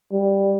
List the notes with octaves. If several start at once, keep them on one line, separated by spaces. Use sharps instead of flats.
G3